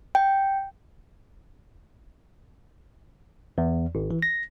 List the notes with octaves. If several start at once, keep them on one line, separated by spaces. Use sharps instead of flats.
G5
E2
G#1
E3
A#6